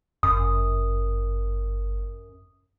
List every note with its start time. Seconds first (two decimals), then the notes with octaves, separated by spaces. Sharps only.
0.23 G1 F#2 D#6